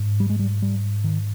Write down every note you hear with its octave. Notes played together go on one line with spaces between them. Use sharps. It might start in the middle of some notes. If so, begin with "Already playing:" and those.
Already playing: G#2
G3
G#3
G3
G3
D#3